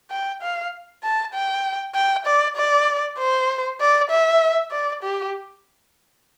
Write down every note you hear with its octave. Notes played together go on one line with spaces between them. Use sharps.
G5
F5
A5
G5
G5
D5
D5
C5
D5
E5
D5
G4